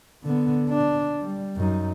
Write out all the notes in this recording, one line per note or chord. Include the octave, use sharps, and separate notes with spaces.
D3 B3
D4
G3
F#2 D#4